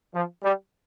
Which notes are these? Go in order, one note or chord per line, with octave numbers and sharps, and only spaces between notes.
F3
G3